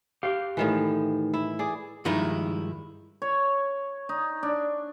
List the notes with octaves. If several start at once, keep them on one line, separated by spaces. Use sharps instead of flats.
G4 F5
A2 D#3 E3
E4
G#4 D5
G2 D#3 F3 G#3 D#4 E4
C#5
D#4
D4